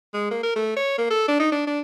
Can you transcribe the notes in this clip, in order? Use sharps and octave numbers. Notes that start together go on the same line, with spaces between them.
G#3
A#3
A#4
A3
C#5
A#3
A4
D4
D#4
D4
D4